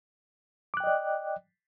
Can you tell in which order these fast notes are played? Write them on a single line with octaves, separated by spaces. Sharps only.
D6 F#6 G5 D#5 D5